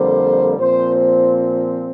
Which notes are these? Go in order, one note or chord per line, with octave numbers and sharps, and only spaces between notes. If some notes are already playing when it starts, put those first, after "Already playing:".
Already playing: F2 D3 G3 A#3 C5
A#2 F3 C4 C5
C5